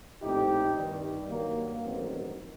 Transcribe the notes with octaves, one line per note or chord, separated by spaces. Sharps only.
A#1 A2 G3 C4 D#4 G4
G2 D#3 G3
G2 D#3 F#3 A#3
A1 G2 D#3 F#3 C4